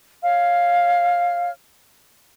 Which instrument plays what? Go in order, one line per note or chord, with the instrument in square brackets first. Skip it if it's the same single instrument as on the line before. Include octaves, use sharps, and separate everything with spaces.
[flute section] C#5 F5 F6